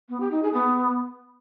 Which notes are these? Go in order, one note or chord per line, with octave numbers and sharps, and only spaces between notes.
B3
G4
D#4
G#4
B3